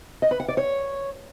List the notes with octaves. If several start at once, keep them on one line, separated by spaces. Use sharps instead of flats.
D#5
B4
F#5
D5
C#5